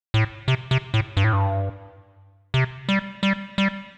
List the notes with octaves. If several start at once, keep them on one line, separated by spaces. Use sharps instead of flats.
A2
C3
C3
A2
G2
A2
G2
C3
G3
G3
G3